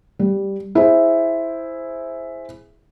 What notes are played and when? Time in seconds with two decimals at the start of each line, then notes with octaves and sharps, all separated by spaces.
0.19 G3
0.75 E4 G#4 C5